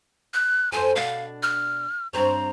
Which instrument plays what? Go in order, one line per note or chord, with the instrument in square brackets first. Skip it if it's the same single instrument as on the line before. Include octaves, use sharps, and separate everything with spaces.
[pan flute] F#6
[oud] F2 A4 C5 [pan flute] G#5
[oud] B2 D4 [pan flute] F5
[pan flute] F6
[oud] G2 C4 C#5 [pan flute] A#5